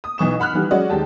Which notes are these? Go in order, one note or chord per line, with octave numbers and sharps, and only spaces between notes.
D#6
B1 E3 C#6 E7
F#5 B5 F6 F#6
D#3 E3 G3
F#3 G#3 C#4 F#4 D5 D#5
D#2 G#3 G4 A5